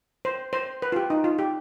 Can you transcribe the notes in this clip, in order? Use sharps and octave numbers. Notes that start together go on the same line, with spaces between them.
C5
C5
B4
F4
G4
D#4
F4
G4